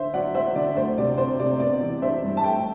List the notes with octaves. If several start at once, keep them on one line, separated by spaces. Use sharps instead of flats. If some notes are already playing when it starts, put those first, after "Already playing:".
Already playing: D3 C5 E5
F#3 D5 F#5
F#3 C5 E5
D3 D5
D2 C5
C3 D5
C4 C5
C3 D5
B3 D5
E3
D4 C5 E5
G2
A5
A3 E5 G5